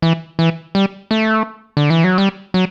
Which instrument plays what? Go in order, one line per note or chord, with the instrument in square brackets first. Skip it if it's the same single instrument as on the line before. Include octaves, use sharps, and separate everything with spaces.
[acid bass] E3
E3
G3
A3
D3
E3
F#3
G3
F#3